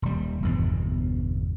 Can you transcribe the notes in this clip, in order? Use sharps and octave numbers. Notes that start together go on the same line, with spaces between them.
D#1 G3
G1 E2 B2